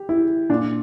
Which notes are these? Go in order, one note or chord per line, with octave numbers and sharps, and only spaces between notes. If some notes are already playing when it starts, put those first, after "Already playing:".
Already playing: G4
E4
A#2 D4